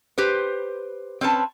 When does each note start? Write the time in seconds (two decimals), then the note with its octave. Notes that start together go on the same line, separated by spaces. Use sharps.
0.18 G4 B4 C5
1.21 C4 C#4 B4 A5